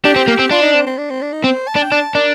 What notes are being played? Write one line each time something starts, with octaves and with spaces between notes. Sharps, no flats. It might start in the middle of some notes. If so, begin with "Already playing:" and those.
D4 G4
C4
A#3
C4
D4 F4
D#4
C4
C4
D4
C4
D4
D#4
C4 C5
A5
D4
G5
D4 A5
D4 A#4